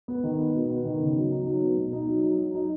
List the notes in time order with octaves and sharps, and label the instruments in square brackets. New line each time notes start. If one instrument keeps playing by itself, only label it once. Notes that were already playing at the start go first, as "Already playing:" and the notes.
[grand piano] B3
D#3
B3
B2
B3
D#3
C#3
F#3
D#4
F#3
B3
B2
D#4
F#3
F#3
F#3
D#4